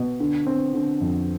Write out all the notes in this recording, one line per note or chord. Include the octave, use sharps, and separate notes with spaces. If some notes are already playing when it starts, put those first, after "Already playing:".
Already playing: B2
D3
C4
D3
F2